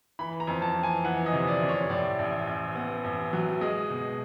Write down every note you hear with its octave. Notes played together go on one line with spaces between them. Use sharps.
E3 B5
A#5
F2
A5
E3
G#5
E3 F#5
D#5
C3
D5
C3
C#5
A2 D5
A1
A1
B3
A1
F#3
G#3 D#5
B2